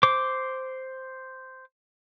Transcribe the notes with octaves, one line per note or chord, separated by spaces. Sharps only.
C5 D6